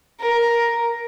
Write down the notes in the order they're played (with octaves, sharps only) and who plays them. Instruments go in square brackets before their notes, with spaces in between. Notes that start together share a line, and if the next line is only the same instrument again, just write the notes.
[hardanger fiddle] A#4